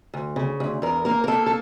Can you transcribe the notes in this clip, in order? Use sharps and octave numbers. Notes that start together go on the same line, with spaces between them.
D2
C#3
D2
E2 A#4
A#3 A#4
A#4
A#3 A4
A4